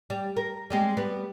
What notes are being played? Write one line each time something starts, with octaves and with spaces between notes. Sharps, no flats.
G3
A#4
G3 G#3 C4
G3 B3